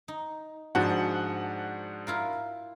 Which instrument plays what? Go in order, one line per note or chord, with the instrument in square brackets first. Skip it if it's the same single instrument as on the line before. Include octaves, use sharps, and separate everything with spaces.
[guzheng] D#4
[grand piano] G#2 F3 [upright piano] D4 F#4 [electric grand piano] F#5 [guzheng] B5
[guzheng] E4 F4 A#4